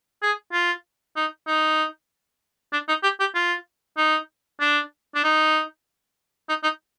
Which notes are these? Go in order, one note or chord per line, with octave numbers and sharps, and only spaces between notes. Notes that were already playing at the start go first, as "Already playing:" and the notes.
G#4
F4
D#4
D#4
D4
D#4
G4
G4
F4
D#4
D4
D4
D#4
D#4
D#4